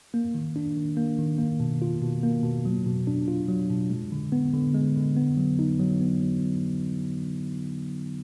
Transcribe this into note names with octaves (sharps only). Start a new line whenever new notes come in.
A#3
D#3
D4
D#3
A#3
D#3
A#3
B2
F4
B2
A#3
B2
F#3
B2
D4
F4
F#3
B2
G#3
D3
B3
D3
G#3
D3
B3
F#3
D#4
F#3
B3
F#3